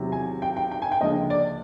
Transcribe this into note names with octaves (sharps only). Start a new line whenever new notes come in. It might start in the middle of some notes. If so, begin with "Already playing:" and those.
Already playing: E2 C3 D#3 F#3
G#5
G5
G5
G5
G#5
G5
D2 C#3 F3 A#3 D#5
D5